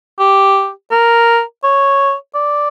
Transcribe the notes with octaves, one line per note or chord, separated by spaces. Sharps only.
G4
A#4
C#5
D5